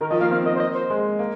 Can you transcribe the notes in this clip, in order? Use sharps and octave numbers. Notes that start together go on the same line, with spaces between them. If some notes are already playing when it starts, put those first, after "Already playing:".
D#3 A#4
F3 D#5
A#3 F5
C4 F5
A#3 D#5
C5
D#5
C5
G#3
A#3